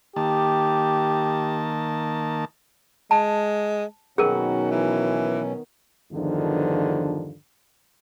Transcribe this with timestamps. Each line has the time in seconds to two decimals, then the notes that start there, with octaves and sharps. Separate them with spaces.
0.16 D#3 A#3 G4 A5
3.11 G#3 A5
4.18 B2 D#3 F#3 B3 C#4 F#4 G#4 A#4
4.71 E3
6.13 E2 G2 D3 D#3 F3